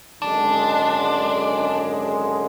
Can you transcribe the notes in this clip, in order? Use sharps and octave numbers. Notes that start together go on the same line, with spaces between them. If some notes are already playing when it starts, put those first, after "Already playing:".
G#1 F#2 D3 G#3 D4